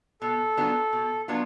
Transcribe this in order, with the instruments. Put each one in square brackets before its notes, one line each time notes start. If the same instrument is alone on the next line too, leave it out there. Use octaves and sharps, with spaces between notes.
[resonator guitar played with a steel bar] B2 [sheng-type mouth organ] A4
[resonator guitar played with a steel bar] F#3 B3 D4 F4
B2
F#3 B3 D4 F4